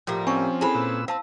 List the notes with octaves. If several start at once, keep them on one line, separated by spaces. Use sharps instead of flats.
A2 F3 G3 A#3
C4 C#4 G#5 C#6
E4 G#4 A4 C5 B5
A#2 B4 E6
C4 F5 A5 E6